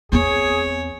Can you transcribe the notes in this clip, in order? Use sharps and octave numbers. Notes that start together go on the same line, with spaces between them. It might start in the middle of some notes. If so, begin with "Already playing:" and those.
E2 C4 G#4 C#5